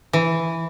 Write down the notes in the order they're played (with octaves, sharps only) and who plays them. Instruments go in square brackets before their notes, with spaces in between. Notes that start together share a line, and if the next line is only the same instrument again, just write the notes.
[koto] E3